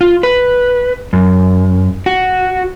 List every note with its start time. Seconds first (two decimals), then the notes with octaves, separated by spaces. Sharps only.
0.01 F4
0.23 B4
1.13 F#2
2.06 F#4